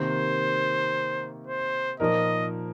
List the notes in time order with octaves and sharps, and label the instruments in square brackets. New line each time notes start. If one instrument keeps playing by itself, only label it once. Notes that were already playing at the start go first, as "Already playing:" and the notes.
Already playing: [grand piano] C3 D#3 A#3 [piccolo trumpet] C5
[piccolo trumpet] C5
[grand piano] A#2 F3 A#3 D#4 A#4 [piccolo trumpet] D#5